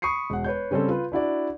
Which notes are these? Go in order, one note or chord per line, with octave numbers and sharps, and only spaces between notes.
B5 C#6 D#6 C7 C#7
E1 F#5
B4 C#5 G6
C#3 G3 C4 C#4 A4
F4 B4
D4 E4 F#4 D5